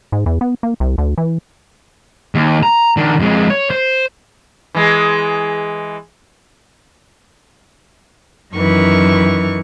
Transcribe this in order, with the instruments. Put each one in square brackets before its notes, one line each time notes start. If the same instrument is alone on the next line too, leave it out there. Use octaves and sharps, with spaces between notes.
[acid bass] G#2
E2
B3
A#3
C2
D2
E3
[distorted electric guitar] D#2
A#5
D#3 D4
F2 G#3
C#5
C5
[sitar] E3 G#3
[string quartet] F#2 D#3 E3 C#6